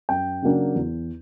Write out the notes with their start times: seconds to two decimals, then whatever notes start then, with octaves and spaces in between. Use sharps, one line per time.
0.09 F#2 G5
0.42 C#3 F#3 A#3 D4
0.76 E2